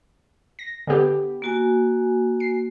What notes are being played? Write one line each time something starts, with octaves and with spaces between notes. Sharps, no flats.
A#6
D3 B3 G4
A#3 F#4 G#5
C7